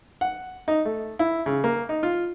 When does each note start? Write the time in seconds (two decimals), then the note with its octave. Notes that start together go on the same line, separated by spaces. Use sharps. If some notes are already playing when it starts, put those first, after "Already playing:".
0.21 F#5
0.68 D#4
0.85 A3
1.19 E4
1.46 C#3
1.64 A#3
1.89 D#4
2.03 F4